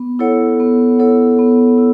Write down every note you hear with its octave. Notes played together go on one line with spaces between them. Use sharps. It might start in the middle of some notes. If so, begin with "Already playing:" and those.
Already playing: B3
E4 A4 C#5 F#5
B3
E4 A4 C#5 F#5
B3
E4